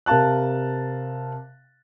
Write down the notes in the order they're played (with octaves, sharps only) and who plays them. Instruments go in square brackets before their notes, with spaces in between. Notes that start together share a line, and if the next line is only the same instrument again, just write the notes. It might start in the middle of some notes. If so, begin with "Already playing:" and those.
[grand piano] C3 A#4 F5 A5 F#6